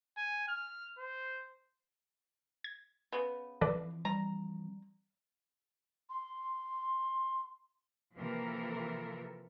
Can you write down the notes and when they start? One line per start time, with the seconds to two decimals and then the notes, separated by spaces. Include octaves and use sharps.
0.17 G#5
0.48 F6
0.98 C5
2.64 G#6
3.12 C#3 B3
3.61 E3 F3 C4 A4 B4 D5
4.05 G3 A#5
6.10 C6
8.15 C3 E3 F3 A#3 A4 A#4